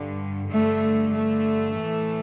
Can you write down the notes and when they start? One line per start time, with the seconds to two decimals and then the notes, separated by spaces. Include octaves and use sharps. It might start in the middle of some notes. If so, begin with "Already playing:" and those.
Already playing: G2 D3
0.52 G2 D3 A3
1.14 A3
1.76 A2 E3